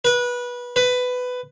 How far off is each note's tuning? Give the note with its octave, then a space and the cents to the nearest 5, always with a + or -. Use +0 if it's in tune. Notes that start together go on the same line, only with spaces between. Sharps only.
B4 -20
B4 +15